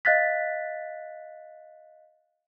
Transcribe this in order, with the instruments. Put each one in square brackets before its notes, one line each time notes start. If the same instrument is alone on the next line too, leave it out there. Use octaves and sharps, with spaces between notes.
[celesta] D#5 F5 F#6 A6 B6